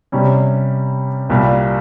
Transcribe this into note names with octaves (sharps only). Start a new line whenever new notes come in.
C3 G3 C#4
C2 A#2 G3